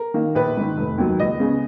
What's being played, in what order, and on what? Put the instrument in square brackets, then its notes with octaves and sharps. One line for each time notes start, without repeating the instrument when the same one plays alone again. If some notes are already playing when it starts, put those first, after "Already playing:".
Already playing: [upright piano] A#4
D#3 A#3
A#1 B4
G#2 D#3
F1
D#2 D#3 F#3
C#2 D#5
C#3 G#3 B3